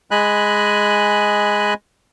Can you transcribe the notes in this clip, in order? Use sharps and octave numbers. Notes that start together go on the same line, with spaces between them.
G#3 D#5 G#5 B5 F#6